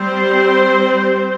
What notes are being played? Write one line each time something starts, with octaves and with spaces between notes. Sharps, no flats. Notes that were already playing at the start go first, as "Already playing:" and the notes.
Already playing: G3 C4 C5